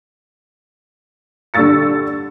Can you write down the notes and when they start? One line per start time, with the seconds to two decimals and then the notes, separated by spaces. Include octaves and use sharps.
1.54 D3 G3 C#6 E6 A6 C#7